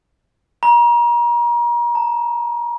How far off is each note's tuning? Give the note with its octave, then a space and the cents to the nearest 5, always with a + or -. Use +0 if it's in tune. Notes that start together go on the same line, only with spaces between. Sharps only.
A#5 +35
A#5 -45